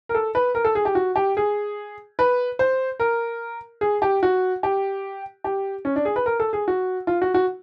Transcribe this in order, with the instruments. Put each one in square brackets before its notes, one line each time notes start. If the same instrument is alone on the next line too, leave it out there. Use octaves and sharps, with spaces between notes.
[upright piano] A#4
A4
B4
A#4
A4
G#4
G4
F#4
G4
G#4
B4
C5
A#4
G#4
G4
F#4
G4
G4
C#4
D4
G#4
B4
A#4
A4
G#4
F#4
F4
F#4
F#4